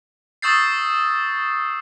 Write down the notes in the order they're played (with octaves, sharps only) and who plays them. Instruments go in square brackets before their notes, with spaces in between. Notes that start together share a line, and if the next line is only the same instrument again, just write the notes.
[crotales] C#6 D#6 E6 G6 A6 C7